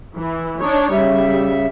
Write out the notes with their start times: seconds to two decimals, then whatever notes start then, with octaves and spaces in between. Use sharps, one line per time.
0.16 E3
0.60 D4 D#4 C#5
0.92 C#3 G3 E5